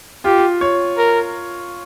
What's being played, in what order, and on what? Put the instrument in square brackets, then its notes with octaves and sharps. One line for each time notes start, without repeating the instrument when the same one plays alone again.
[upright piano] F4 [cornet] G4
[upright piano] C#5
[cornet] A#4